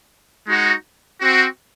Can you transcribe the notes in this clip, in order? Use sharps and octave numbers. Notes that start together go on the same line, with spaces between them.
G#3 D#4 F#4
C4 F#4